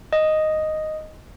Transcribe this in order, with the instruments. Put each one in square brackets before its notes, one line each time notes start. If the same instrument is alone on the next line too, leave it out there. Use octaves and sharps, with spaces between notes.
[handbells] D#5